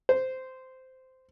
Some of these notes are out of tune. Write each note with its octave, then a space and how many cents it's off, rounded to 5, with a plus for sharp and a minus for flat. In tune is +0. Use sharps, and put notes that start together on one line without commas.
C5 -10